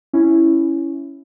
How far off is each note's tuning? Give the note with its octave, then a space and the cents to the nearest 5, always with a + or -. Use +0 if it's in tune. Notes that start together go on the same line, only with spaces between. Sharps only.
C#4 +0 E4 +0